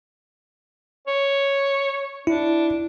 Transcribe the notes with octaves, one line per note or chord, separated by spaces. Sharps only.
C#5
D4 E4